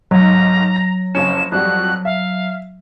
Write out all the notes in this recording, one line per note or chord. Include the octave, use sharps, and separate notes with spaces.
B1 G#2 F#3 A#5
A#6
F#1 F2 C#4 E7
F2 G3 F#4 F#6
E5 F5